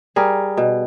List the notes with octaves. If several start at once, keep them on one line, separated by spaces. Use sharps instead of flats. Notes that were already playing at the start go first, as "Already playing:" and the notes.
G3 G#4 A#4
B2